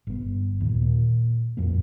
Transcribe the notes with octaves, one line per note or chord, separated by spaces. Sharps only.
G1 B3
D#2 A#2
A#2
A#1 F2 F#3 A#3